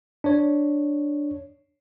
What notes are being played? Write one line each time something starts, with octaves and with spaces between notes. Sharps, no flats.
D4 C#5